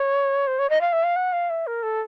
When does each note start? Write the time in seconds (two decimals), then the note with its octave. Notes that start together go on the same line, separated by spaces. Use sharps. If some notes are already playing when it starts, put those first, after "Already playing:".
Already playing: C#5
0.47 C5
0.59 C#5
0.70 D#5
0.81 F5
0.93 E5
1.04 F5
1.16 F#5
1.33 F5
1.50 E5
1.67 A#4
1.83 A4